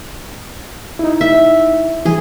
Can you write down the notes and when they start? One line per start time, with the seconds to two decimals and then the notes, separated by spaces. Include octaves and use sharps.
0.99 D#4 E4
1.21 E5
2.06 E3 G#4